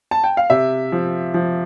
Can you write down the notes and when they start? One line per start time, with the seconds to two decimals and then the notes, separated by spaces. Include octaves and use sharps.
0.11 A5
0.24 G5
0.37 F5
0.50 C3 E5
0.92 F3
1.34 F3